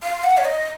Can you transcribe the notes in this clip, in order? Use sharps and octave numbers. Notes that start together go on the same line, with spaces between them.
F5
F#5
C#5
D#5